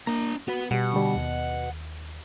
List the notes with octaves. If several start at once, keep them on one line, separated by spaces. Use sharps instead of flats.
A#3 D4 A#5
B3 F#4 B4
B2 G3 G4 F#5
D3 G3
D#2